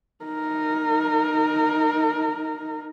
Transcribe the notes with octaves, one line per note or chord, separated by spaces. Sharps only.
D#4 A#4